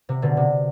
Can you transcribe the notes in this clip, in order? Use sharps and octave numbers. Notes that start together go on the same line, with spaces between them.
C3
B2 D3
C3